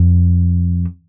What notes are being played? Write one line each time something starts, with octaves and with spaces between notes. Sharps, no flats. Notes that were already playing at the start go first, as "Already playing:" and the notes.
Already playing: F2